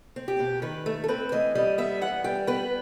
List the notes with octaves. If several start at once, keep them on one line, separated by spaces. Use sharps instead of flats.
C4
G4
B2
D#3 B4
A3
A4
C4 B4
E3 D#5
G3 D#5
B3 E5
E3 F#5
G3 G5
B3 B4